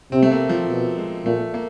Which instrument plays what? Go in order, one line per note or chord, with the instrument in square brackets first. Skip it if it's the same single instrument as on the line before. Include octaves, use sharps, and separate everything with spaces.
[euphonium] C3 [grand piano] C4
[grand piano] A3
A#3
F3
[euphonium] B2
[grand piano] G#3
[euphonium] A#2 [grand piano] A3
[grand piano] A#3